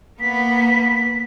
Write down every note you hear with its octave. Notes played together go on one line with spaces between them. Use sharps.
A#3 B3 B4 B6